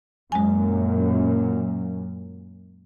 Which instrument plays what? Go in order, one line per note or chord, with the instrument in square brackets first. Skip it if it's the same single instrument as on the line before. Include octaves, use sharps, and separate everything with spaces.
[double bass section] F#2 A#2 [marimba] G#3 G#5